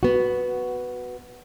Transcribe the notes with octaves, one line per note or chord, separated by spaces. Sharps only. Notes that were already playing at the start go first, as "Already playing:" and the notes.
B3 F#4